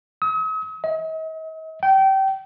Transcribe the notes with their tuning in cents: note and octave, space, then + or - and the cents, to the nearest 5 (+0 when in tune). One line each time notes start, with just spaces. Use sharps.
D#6 +45
D#5 +45
G5 -25